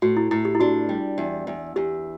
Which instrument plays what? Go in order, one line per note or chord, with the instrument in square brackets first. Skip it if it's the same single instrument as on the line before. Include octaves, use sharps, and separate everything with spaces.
[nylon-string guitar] A2 [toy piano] F#4
[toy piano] E4
[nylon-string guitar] A2 [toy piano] E4
[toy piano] G4
E4
[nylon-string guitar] D4 [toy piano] F#4
[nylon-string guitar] G3
E2
E2
[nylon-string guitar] E2 [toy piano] G4